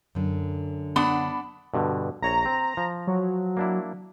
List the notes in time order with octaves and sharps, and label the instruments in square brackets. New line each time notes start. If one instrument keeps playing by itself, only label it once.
[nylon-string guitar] F#2 D3
[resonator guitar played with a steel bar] B3 D4 F#5 [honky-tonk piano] B5
[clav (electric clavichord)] G2 B2 D3
[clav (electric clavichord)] A#1 C#5 [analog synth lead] A#5
[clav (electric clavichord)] C4
F3
[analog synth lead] F#3
[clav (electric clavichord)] A#3 D4 E4